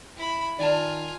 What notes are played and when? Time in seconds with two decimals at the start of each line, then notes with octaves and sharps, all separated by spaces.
0.16 E4 B5
0.59 D#3 F4 D5 G#5 A5